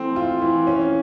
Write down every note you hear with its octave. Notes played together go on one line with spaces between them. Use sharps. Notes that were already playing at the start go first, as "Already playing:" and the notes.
Already playing: E3 A3 C4
F4
E3
C#4